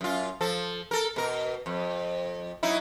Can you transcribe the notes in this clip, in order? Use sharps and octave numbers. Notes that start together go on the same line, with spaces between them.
F#2 F4
F3 A4
A4 A#4
B2 A#4
F2
F#3 D#4 E4